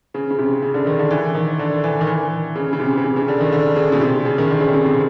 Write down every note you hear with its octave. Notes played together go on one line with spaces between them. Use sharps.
C#3
C#3
C3
C#3
D3
D#3
D3
E3
D#3
D3
E3
D#3
E3
C#3
C#3
C3
C#3
C3
C#3
D3
D#3
D3
C#3
B2
C3
C#3
D#3
D3
C#3
C3
C3